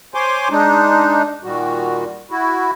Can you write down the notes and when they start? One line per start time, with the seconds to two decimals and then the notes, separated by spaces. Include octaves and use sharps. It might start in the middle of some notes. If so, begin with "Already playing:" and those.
0.14 C5 C#5 G#5 C6 D6
0.50 G#3 D4 D#4
1.44 A#2 D#3 G3 F#4
2.31 E4 F#4